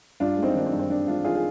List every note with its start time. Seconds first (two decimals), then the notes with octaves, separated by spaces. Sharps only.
0.20 G2 D4 F4
0.37 G#3
0.43 C4 D#4
0.55 D#3 D4
0.66 C4
0.72 G2
0.79 C4
0.89 G2 D4
1.07 G#3 D4 F4
1.24 D#3 F4 G#4
1.35 G#4